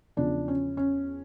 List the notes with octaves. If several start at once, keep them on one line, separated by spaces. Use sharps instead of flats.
E2 C#3 F3 D4
C#4
C#4